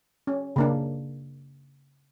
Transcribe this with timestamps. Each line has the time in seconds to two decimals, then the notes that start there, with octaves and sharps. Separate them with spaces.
0.27 C#4
0.56 C#3 A#3 D4